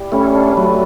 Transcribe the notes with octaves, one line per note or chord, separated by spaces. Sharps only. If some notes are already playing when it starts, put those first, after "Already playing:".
Already playing: E4 G4 D5
G3 A3 C#4
D4
F#3 A3 B4